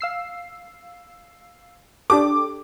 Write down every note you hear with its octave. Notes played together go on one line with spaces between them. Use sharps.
F5 E6 C7
D4 G4 A4 D6